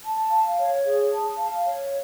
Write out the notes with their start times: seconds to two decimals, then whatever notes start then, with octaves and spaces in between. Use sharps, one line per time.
0.03 A5
0.31 F5
0.58 C#5
0.85 G#4
1.11 A5
1.38 F5
1.66 C#5